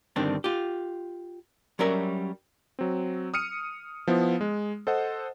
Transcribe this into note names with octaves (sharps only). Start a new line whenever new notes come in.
G2 D3 D#3 C4 D4
F4 G4
F#3 G3 C#4 A#4 E5
F#3 C4
D#6 F6 C#7 D#7
F3 B3 E4
G#3
A4 C5 D#5 F#5